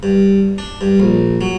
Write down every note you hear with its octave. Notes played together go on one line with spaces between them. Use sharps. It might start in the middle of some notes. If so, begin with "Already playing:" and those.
G2
D4
G2
A#1
F#3